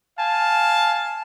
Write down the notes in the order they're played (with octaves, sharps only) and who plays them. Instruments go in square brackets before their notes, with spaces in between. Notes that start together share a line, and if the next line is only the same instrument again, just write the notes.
[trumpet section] F5 G#5 A5